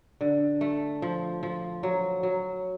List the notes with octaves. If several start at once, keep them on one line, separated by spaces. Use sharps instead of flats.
D3
A3
F3
F3
F#3
F#3